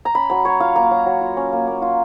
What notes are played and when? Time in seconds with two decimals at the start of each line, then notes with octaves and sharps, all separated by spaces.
0.05 A#5
0.15 C#4 B5
0.30 F#3 A#5
0.45 F#3 C#5
0.60 F4 F5
0.76 A#3 A#5
0.91 F#3
1.06 F#3
1.21 F4
1.37 C#4
1.53 A#3
1.67 A#3
1.82 F4